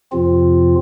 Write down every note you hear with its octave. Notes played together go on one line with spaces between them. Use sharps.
F2 C3 F3 C4 F4